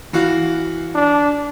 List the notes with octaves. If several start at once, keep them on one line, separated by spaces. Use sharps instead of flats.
E3 F#4 F5
D4